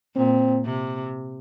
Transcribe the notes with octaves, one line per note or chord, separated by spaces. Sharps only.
A#2 C4
C3